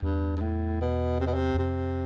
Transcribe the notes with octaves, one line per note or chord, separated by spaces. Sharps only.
E2 G2
G2
A2
B2
C3
B2
C3
E2
F2 C3